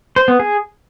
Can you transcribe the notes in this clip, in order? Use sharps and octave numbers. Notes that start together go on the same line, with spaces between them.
C5
B3
G#4